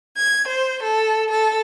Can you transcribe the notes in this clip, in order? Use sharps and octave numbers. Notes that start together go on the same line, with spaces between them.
G#6
C5
A4
A4